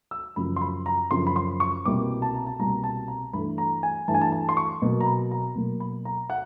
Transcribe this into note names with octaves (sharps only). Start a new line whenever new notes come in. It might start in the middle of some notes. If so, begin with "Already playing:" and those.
E6
F#2 C#3 F3 B5
C6
B5
A#5
F#2 C#3 F3 C6
B5
C6
C#6
C2 B2 G3 A#3 D6
A5
A#5
A5
C2 B2 G3 A#3 A#5
A5
A#5
G2 E3 A3 B5
A#5
G#5
G2 E3 A3 A5
G#5
A5
A5
C6
C#6
B2 F#3 A#3
A#5
B5
A#5
B2 F#3 A#3
B5
A#5
F#5